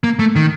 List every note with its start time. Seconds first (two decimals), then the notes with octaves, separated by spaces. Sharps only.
0.04 A#3
0.19 A3
0.36 D#3